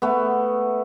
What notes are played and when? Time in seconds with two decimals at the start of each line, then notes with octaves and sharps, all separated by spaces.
0.02 A3 B3